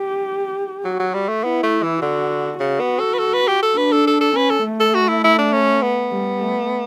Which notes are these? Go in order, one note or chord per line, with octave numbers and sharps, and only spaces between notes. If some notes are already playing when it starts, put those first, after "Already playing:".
Already playing: G4
F#3 F#4
F#3
G3
A3
B3 E4
A3
E3
D3 F#4
C#3 F#4
B3
A4
B4
A4
B4
G4
A4
D4 B4
A4
A4
A4
C#4 B4
A4
A3
A4
F#4
E4
E4
D4
C#4
B3
G3
A3